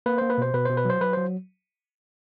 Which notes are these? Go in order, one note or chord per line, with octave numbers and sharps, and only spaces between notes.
A#3 B4
A#3 C5
B4
B2 C5
B2 B4
B2 C5
B4
F#3 C5
F#3 B4
F#3 C5